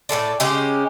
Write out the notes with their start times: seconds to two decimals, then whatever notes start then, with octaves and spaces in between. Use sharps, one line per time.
0.09 A2 F#3 A4 D5
0.40 C#3 G#3 C#4 G4